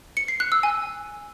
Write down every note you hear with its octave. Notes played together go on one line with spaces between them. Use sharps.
C#7
C7
F#6
E6
G#5